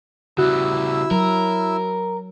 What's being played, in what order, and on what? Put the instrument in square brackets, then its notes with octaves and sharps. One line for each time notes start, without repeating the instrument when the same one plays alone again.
[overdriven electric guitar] C#3 G3 [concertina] E4 E6 [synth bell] F#4
[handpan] F#3 [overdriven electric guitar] A#4